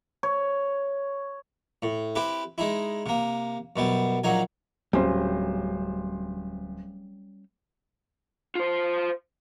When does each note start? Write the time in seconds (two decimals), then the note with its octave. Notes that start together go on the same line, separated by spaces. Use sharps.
0.23 C#5
1.82 A2
2.15 C4 E4 G4 B4
2.58 G#3 D#4 E4
3.06 C3 A#3
3.76 F#2 B2 G3
4.24 A#1 F#3 D#4 G#5
4.93 D1 G3 C#4 C5
8.55 F4 C5